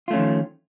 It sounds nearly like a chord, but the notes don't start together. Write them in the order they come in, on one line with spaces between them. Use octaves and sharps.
F4 A3 C#4 F3 D#3